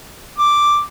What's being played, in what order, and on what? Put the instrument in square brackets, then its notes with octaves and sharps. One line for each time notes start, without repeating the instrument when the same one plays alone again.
[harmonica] D6